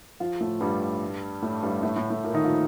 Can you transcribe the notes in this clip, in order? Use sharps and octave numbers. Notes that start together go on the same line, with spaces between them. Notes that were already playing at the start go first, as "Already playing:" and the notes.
F3 F4
A2 A3
G2 G3
A2 A3
G2 G3
A2 A3
A2 A3
A2 A3
A#2 A#3
D#3 D#4
F3 F4